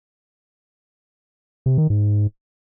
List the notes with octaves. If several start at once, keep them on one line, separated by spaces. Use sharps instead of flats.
C3
D#3
G#2